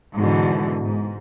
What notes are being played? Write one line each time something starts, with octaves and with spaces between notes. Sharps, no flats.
G#2 B2 D3 E3
G#2